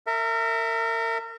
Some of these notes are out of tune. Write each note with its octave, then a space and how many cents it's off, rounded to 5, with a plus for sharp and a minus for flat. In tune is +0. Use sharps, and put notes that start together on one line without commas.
A#4 -30 E5 +0